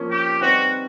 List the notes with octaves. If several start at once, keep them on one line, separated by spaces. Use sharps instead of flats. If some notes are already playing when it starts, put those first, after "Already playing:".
Already playing: F3 A#3 C#4
G4
G3 C4 D#4 F#4 G4 B4